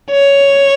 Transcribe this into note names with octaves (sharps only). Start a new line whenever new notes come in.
C#5